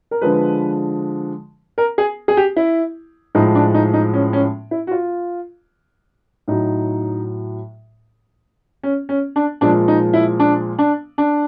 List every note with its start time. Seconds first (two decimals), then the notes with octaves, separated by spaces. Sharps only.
0.11 A#4
0.21 D3 F3 G#3 B4
1.78 A#4
1.98 G#4
2.28 G#4
2.37 G4
2.56 E4
3.35 A2 F3 G#3 D#4
3.55 D4
3.74 D#4
3.94 D#4
4.14 C#4
4.33 C#4
4.71 E4
4.87 F#4
4.91 F4
6.48 A2 F#3 D#4
8.83 C#4
9.09 C#4
9.36 D4
9.61 A#2 F3 G#3 D4
9.88 D#4
10.13 E4
10.40 D4
10.79 D4
11.18 D4